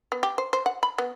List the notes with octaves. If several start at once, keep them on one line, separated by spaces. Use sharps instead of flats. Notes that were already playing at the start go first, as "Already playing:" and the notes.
B3
G4
C5
C5
F#5
B5
B3